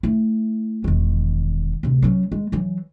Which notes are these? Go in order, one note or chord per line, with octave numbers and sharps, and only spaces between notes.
A3 E4
E1 D#3
D1 C3
F#3 C#4
G#3
E3 F#3